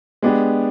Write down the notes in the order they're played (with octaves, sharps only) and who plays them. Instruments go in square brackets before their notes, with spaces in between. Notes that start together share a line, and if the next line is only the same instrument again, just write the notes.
[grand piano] G#3 B3 D4 G4